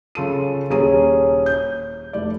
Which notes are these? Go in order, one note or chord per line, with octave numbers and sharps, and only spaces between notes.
C#3 F4 A4 D#7
D#1 C#4 G#4 C#5 A#5 D#7
G6
F1 D5